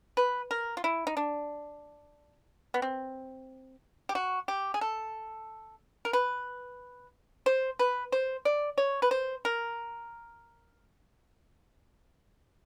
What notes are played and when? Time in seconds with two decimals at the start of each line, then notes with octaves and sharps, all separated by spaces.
0.17 B4
0.51 A#4
0.77 F4
0.84 E4
1.07 D#4
1.17 D4
2.74 B3
2.82 C4
4.09 G4
4.15 F#4
4.48 G4
4.74 G#4
4.81 A4
6.05 A#4
6.13 B4
7.46 C5
7.79 B4
8.12 C5
8.45 D5
8.78 C#5
9.02 B4
9.11 C5
9.45 A#4